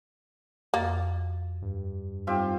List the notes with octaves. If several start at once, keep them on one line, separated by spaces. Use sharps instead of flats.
F2 A#3 F#4 A6
G2
G3 C4 D#4 F4 G4